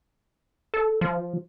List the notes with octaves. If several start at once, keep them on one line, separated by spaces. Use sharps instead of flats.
A4
F3